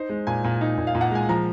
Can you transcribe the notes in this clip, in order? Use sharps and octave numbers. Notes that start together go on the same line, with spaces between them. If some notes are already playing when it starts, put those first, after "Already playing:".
Already playing: D#4 C5
G#3
A#2 G#5
A#2
D#4
A#2
F5
A#2
F#5
G#3 G#5
F3 A#5